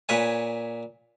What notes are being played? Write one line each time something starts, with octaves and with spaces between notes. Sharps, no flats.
A#2 B4 C#5 G#5